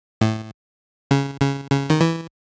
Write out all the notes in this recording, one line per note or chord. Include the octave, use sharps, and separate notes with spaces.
A2
C#3
C#3
C#3
D#3
E3